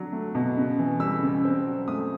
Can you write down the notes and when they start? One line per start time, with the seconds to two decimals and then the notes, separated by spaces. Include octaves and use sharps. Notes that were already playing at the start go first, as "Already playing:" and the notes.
Already playing: F#3 D4
0.12 A3
0.35 B2
0.57 C#3
0.79 E3
1.00 G3 E6
1.23 C#3
1.45 C4
1.66 F#3
1.88 A3 D#6